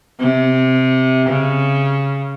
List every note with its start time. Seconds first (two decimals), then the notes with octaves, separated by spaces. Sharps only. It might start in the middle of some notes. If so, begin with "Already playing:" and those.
0.20 C3
1.29 C#3